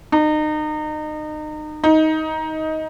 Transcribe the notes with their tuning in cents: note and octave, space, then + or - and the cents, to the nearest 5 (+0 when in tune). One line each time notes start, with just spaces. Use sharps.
D#4 -30
D#4 +15